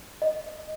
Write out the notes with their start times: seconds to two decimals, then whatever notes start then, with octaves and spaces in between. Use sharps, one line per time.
0.22 D#5